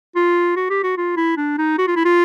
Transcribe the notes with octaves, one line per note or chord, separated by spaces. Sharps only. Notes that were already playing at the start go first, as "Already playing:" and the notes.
F4
F#4
G4
F#4
F4
E4
D4
D#4
F#4
F4
E4
F4